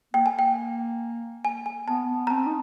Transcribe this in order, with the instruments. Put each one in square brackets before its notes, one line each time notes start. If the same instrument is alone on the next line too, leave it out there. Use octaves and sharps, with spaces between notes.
[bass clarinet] A#3 [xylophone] G5
[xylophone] G#5
G5
G#5
G#5
[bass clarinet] B3 [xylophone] A5
[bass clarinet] B3
[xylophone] A#5
[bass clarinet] C4 [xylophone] A5
[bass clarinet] D#4